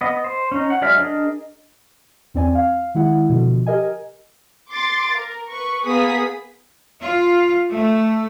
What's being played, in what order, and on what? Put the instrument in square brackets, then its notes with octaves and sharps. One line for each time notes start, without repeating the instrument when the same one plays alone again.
[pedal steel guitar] B3 D#5
C5
C#4 D#4
F#5
F#3 G#3 D5 E5 F6
D4 G#4 A#4 D#5
[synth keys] E2 C4 D5 G#5
F5
D#3 G#3 E4 F#5
B2 D3 F3
G4 A#4 D#5 G#5
[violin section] C6 D6 A6
A#4
B4 C#6
A#3 B3 G#4 D#6 B6
[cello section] F4
A3